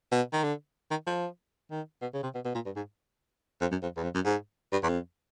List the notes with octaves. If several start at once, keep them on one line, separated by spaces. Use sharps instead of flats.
B2
D#3
D3
D#3
F3
D#3
B2
C#3
C3
B2
B2
A#2
G2
G#2
F2
F#2
F2
E2
F2
F#2
G#2
G2
E2
F2